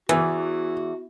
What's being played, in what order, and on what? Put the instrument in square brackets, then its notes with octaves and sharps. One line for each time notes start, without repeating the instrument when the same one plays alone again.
[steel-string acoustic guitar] E2 [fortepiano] E3 [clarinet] F#4